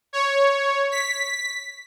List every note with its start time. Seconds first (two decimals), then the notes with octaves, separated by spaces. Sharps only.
0.13 C#5
0.91 B6